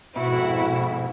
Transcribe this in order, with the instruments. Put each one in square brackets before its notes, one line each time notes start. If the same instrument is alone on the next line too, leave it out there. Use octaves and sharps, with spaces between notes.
[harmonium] F2 G#2 [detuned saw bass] B2 [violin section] E4 [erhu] F#4